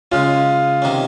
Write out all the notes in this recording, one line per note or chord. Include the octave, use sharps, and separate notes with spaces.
C#3 G#3 C#4 F4
C3 D#3 A#3 C#4